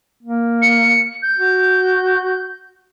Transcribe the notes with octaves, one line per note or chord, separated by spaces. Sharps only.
A#3
C#7
G6
F#4